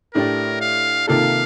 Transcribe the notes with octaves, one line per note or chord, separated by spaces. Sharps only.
A2 A3 D4 G4 A#4 D5
F5
C3 D#3 A#3 F4 A4 F5